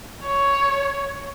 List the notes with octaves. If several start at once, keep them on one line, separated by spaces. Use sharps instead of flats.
C#5